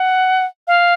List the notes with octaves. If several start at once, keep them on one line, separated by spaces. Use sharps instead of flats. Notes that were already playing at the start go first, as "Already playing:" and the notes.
Already playing: F#5
F5